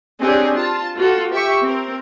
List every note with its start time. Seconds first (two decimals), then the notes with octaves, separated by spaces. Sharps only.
0.20 C4 D4 D#4 G4 G#4 C#5
0.54 F4 A5
0.96 F4 F#4 A4
1.31 G4 E5 G5 C#6
1.63 C4 A#4